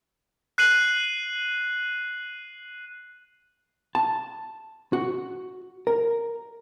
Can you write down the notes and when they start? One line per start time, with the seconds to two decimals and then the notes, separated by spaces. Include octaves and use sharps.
0.58 F#6 C7 D#7 F#7
3.95 A5
4.93 F#4
5.87 A#4